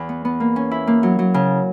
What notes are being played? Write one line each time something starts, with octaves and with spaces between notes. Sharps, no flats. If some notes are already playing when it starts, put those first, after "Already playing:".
Already playing: E2
B3
B3
A#3
C#4
E4
A#3
F#3
F#3
C#3